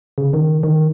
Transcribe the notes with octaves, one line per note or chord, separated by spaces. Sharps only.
C#3
D#3
D#3